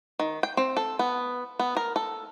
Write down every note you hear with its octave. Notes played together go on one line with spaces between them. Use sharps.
D#3
G5
C4
A4
B3
B3
A#4
A4